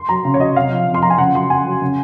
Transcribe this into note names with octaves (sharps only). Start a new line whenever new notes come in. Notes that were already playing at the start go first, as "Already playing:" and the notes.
Already playing: C6
F#3 A#5
C#3
C#5
F#3 D#5
C3 F5
F3
C3
C6
F3 A#5
G#5
C#3 F#5
F#3 C6
C#3 G#5
F#3
C#3